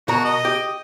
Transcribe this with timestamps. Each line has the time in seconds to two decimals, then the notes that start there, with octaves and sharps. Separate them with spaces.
0.08 B2 F#4 A#4 A#5
0.25 D#5
0.45 G4